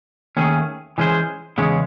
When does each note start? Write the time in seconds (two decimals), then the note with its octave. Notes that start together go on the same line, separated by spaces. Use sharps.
0.37 D#2 D#3 A3 C#4 G#4
0.98 E3 G#3 C#4 G#4 C5
1.58 E2 C#3 G#3 C#4